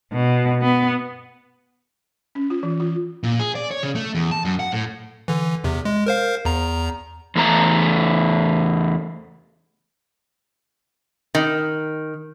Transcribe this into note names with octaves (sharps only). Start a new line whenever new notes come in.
B2
B3
C#4
F4
E3
F4
A#2
G#4
D5
C#5
C#3
A3
E2
A5
F#2
F#5
A2
D3 E3
E2 C3
G#3
A#4 C5 F5
E2 A#5
E2 A3 A#5
D#3